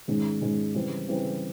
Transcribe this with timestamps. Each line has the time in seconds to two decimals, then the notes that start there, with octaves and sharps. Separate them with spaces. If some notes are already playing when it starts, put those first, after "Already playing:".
0.08 G#2 D#3 G#3 C#4
0.41 G#2 D#3 G#3 C#4
0.74 C#3 E3 G3 C4
1.08 C#3 E3 G3 C4